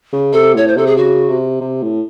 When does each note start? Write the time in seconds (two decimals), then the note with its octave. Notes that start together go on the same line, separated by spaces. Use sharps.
0.13 C#3
0.33 C3 A4
0.55 A2 C#5
0.67 C5
0.77 C3 A4
0.87 G#4
0.97 C#3 F#4
1.30 C3
1.61 C3
1.82 A2